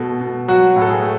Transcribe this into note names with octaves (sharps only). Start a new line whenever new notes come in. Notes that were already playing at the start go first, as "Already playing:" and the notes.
Already playing: B2 A3 A4
B2
F#3 F#4
A2
A4
G#4
A3